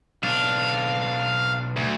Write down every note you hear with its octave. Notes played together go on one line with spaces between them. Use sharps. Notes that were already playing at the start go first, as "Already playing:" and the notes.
B1 D4 F5
D2